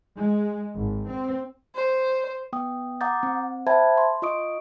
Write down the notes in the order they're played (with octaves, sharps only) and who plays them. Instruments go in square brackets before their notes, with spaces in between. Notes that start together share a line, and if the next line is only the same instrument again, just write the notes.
[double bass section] G#3
G#1
C4
[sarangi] C5
[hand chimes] B3 G5 D#6
F#5 A#5 D6 D#6 G6 A6
C4
C5 E5 G5 A5 B5 G#6
C6
F4 D#5 C#6 D#6 D7